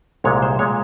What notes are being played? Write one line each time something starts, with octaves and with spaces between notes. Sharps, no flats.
C2 A#2 G#3 C#5
C5
A#2 G#3 C#5